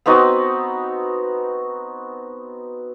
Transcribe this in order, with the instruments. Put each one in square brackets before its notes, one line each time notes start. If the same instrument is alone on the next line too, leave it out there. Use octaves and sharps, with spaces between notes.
[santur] B3 C4 D#4 F#4